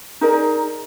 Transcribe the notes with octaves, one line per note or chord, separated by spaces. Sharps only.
D#4 G#4 A#4 D5